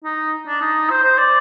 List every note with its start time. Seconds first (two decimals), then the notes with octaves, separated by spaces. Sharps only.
0.04 D#4
0.47 D4
0.61 D#4
0.90 C5
1.04 C5
1.18 D5